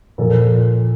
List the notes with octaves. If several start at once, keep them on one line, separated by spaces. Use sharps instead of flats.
A#2 F3 A#3 F4 A4